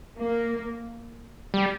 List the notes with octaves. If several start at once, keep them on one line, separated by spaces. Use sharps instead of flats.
A#3
G3